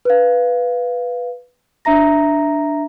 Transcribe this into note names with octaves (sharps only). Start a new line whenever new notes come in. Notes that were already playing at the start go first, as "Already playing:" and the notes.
B4 F5
D4 E5 A#5 A#6